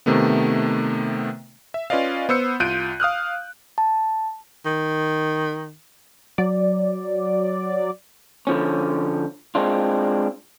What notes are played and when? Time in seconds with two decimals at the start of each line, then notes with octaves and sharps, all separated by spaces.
0.06 C3 D#3 A3 B3
1.74 E5
1.90 C#4 F4 B4 D5 D#5 F5
2.29 B3 C5 E6 C#7
2.60 C2 F4 F#6 G6 D7 D#7
3.00 F5 D#6 F6 F#6
3.78 A5
4.66 D#3
6.38 F#3 D5
8.47 D3 F3 C#4
9.55 G#3 C4 D4 F4